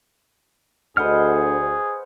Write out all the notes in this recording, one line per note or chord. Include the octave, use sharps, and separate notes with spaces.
D2 G#4 B4 C5 D#5 F#5 F6